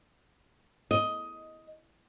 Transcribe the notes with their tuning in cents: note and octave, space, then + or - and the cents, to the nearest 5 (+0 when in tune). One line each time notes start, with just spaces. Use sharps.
D#5 +10